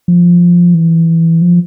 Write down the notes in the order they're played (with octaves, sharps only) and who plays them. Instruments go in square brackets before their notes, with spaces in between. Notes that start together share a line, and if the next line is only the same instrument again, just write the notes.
[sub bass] F3
E3
F3